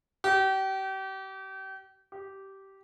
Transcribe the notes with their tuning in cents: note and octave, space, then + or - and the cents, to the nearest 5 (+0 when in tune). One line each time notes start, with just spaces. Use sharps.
G4 -35
G4 -15